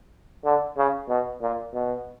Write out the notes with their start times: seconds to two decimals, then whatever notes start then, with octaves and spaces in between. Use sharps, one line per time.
0.44 D3
0.77 C#3
1.09 B2
1.41 A#2
1.73 B2